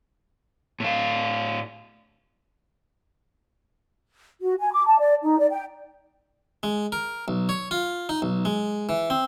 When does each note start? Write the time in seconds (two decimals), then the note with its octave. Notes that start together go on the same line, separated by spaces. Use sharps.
0.80 A2 F5
4.41 F#4
4.60 G#5
4.73 D6
4.86 A5
4.99 D5
5.22 D#4
5.39 D5
5.51 G5
6.63 G#3
6.92 A#4
7.28 B1
7.49 C#5
7.71 F4
8.09 D#4
8.22 B1
8.45 G#3
8.89 E3
9.10 C4